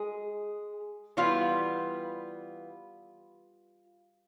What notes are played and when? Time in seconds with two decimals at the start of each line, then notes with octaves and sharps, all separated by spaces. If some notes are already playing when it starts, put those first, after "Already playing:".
Already playing: G#3 G#4
1.17 E3 G3 B3 F4